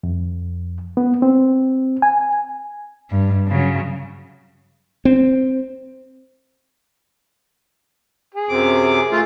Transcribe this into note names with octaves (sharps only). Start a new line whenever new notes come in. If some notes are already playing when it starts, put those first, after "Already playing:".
F2
B3
C4
G#5
G2
C#3 F#3
C4
G#4
F#2 C3 D6
A3 F4